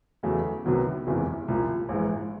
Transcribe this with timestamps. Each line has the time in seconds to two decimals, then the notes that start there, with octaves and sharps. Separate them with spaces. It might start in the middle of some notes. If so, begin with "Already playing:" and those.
0.23 E2 C#3 F#3 A3
0.65 C2 C3 D#3 F#3 B3
1.07 F#1 E2 C3 E3 G#3
1.48 C2 A#2 F3 A#3
1.89 A#1 G#2 E3 G#3